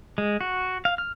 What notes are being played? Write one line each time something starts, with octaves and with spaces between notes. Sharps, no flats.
G#3
F#4
F5
F6